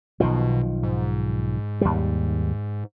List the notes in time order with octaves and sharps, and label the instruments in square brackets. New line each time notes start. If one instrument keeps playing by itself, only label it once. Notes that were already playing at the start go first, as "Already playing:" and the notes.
[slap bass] B1 D#3 F3 [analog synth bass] B2
[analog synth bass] G#2
[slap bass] D#2 G3